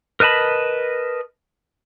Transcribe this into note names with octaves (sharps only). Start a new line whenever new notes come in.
A#4 B4 D#5 A5 B5